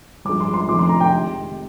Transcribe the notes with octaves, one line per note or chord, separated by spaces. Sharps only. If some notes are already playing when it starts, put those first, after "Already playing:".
G2 F3 G#3 D6
C6
C6
F1 F2 D#3 G#3 D6
C6
A#5
G5
C3 D#3 G#3